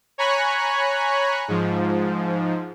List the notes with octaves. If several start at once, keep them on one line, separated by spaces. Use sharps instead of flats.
C#5 G#5 A#5 B5 C#6 F#6
G#2 F3